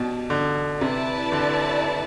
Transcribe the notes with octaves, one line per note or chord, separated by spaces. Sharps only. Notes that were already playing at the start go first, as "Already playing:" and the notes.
Already playing: B2 D4 G4 D5 A5
D3
C3 E4 B4 D5 A5
D3